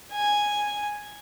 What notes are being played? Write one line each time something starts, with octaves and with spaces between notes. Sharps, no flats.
G#5